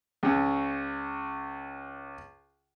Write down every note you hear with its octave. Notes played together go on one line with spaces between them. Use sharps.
C#2 C#3